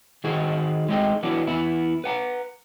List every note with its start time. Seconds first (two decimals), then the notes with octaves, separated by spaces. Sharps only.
0.24 D#3 D#4 F#4 G#4 C5
0.89 G#3 A3 C4 D#4 C#5 G5
1.23 E3 F#3 B3 D4
1.47 E2 B3 E4
2.04 B4 F#5 A5 A#5